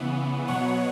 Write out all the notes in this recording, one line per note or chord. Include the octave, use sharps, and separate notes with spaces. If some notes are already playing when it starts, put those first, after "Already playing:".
Already playing: C#3 E3 B3
B2 F#3 B3 C#5 F#5